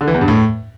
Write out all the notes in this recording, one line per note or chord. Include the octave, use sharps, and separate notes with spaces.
D3
E3
E2
G2
A2